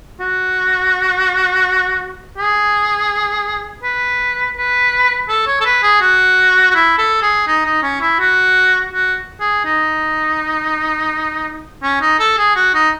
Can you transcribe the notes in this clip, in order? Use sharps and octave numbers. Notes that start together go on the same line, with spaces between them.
F#4
G#4
B4
B4
A4
C#5
A4
B4
G#4
F#4
F#4
E4
A4
G#4
D#4
D#4
C#4
E4
F#4
F#4
G#4
D#4
C#4
D#4
A4
G#4
F#4
D#4